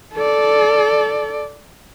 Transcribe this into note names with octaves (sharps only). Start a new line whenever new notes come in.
A4 D5